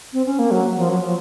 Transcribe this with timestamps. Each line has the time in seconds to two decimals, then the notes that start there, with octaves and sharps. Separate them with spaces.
0.13 C4
0.26 C#4
0.39 A#3
0.51 F#3
0.77 F3
0.89 F#3
1.02 F3